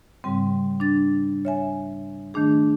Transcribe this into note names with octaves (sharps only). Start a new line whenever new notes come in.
G#2 C#3 G3 C4
D4 A6
C#5 E5 G#5
D#3 A3 D4 G#4